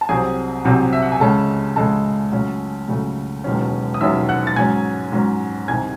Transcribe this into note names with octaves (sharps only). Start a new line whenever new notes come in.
A5
C2 C3 F#3 C4 G#4 G#5
C2 C3 F#3 C4
E5
F#5
G#5
C#2 C#3 G#3 C#4 A4 A5
C#2 C#3 G#3 C#4 A4 A5
C#2 C#3 F#3 A3 C#4
C#2 C#3 F#3 A3 C#4
E1 D#2 D#3 F#3 C#4
D#6
E1 D#2 D#3 F#3 C#4 E5 E6
F#5 F#6
A6
G#2 F#3 C#4 G#5 G#6
G#2 F#3 C#4
C2 C3 D#3 G#5 G#6